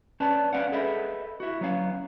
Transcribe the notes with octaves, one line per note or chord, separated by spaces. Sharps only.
C#4 B4 D5 A5
C#4 B4 D5 F5 F#5
G#4 A4 B4 D#5 E5
E4 F#4
F#3 B3 C#4 F5